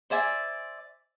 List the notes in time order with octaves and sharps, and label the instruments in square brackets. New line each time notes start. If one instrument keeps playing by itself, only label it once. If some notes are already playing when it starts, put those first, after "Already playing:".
[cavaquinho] C5 D5 E5 G#5